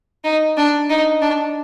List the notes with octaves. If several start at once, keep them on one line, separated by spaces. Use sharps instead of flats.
D#4
D4
D#4
D4